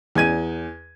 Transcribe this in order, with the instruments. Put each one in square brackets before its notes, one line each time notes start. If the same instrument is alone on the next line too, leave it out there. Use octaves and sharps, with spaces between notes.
[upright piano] E2 G#5 G#6 D#7